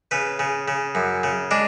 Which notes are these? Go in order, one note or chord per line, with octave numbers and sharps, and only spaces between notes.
C#3 B4
C#3
C#3
F#2
C#3
G#3 D4